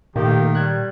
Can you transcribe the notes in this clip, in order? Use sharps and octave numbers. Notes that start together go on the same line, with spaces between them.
A#2 D#3 A3 A#3 D#4 G4
G3 F#6 G#6